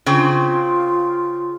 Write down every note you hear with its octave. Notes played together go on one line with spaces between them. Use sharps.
C#3 C4 F4